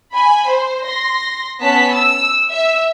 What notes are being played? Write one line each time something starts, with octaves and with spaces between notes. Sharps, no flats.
G#5 B5
C5
C6 A#6
B3 C#4 A5 B6
E6
E5 E6